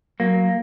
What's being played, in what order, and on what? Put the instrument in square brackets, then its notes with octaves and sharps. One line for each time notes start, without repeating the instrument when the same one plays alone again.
[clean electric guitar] F#3 A#3